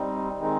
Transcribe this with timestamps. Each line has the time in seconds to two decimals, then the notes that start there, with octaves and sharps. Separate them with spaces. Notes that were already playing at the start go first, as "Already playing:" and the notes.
Already playing: G3 C4 D#4
0.38 D#3 G#3 C4 D#4